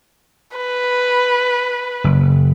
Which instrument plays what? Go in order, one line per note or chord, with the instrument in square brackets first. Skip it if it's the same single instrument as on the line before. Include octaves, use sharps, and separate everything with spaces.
[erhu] B4
[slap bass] F#1